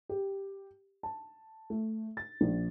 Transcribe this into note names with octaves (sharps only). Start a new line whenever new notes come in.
G4
A5
A3
A6
A#1